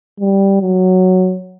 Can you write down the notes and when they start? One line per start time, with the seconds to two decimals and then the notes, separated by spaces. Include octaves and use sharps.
0.20 G3
0.61 F#3